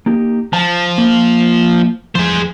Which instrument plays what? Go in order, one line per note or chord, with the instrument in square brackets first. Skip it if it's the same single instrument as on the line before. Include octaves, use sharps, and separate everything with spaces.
[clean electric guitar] A#3 D#4 G4
[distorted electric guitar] F3 [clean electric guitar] F5 A5
[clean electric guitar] A#3
[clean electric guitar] E2 F3 [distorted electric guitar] G#4 C5